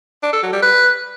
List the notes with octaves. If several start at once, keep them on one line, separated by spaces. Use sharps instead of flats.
D4
A4
F#3
G3
B4